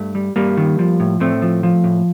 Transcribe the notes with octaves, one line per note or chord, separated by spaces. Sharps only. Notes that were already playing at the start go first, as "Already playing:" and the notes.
Already playing: G2 A3
G3
G2 G3 A#3
D#3
F3
A2
A2 A3 C4
F3
F3
A2